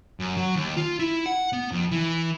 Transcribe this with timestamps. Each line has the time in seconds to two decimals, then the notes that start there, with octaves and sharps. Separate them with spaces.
0.20 F#2
0.36 F#3
0.55 D#2
0.77 F4
0.99 E4
1.26 F#5
1.53 B3
1.72 F2
1.91 E3